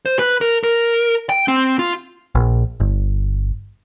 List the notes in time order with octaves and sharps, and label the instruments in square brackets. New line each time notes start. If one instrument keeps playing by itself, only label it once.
[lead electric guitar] C5
B4
A#4
A#4
G5
C4
F4
[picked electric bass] A#1
G1